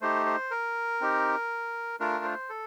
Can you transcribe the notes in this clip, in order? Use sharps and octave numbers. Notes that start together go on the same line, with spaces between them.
A3 D#4 G4 C5
C5
A#4
C4 D#4 G4
A3 D4 F4 A#4
C5
A4